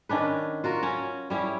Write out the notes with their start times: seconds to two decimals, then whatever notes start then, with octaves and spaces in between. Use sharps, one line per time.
0.09 D#3 C#4 D4 B4
0.64 F4 F#4 A#4
0.83 C#4
1.30 G3 C#4 E4